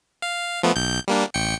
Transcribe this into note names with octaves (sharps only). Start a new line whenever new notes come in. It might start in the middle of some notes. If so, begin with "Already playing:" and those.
F5
F3 A3 B3
B1 G6
G3 A#3 D4
A1 G5 C#7